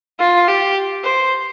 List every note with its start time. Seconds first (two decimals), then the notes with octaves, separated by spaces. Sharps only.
0.19 F4
0.48 G4
1.04 C5